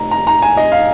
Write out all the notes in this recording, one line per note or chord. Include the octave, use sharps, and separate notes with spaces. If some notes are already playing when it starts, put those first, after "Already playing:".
Already playing: F1 F2 A#5
A#5
A#5
G#5
D#5
F5